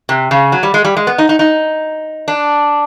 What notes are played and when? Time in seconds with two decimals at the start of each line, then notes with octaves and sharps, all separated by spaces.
0.09 C3
0.31 C#3
0.52 F#3
0.63 G3
0.74 G#3
0.84 G3
0.97 G#3
1.07 B3
1.18 D#4
1.29 D#4
1.39 D#4
2.28 D4